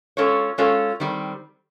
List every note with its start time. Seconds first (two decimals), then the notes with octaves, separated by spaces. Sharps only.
0.17 G#3 C#4 F4 A4 C#5
0.58 G#3 C#4 F4 A4 C#5
1.00 D#3 G3 C4